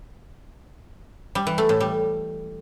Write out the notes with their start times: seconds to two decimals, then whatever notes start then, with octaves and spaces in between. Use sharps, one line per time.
1.35 G3
1.47 E3
1.58 A3
1.69 A2
1.80 G3